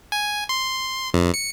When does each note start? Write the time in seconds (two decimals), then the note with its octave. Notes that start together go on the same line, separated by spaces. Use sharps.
0.12 G#5
0.49 C6
1.14 F2
1.34 C#7